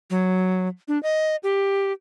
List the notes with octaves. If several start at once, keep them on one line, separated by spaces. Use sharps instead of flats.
F#3
D4
D#5
G4